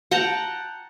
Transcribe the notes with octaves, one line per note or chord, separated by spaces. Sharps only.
F#5 G5 A5 A#5